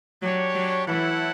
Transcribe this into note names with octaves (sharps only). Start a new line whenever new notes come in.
F#3 D4 G4 C#5
F#3
E3 A3 E4 A4 C#5 F#5